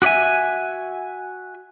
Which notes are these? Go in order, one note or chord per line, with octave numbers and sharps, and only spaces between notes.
F#4 G4 D5 E5 G#5